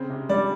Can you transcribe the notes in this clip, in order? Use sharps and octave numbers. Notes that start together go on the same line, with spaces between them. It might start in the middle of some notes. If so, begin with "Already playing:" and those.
Already playing: C#3 C4
C3
G3 D5